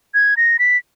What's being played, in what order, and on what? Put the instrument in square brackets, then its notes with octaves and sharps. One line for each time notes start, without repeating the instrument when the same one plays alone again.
[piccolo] G#6
A#6
B6